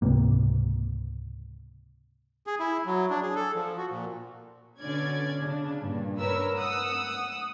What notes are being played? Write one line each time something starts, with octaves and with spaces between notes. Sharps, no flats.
C#2 G#2 C3 A#3
G#4
E4
F#3
D4
G#4
A4
F3
F#4
A#2
B2 D3 C#4 D5 G#6
C#3 D4
G2 A#2
A#4 B4 C#5 E6
F#5 D#6 E6